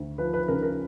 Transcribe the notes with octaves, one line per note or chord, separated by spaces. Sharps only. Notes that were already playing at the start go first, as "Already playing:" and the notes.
Already playing: D2
F3 B4
B4
C#3 A#4
A#4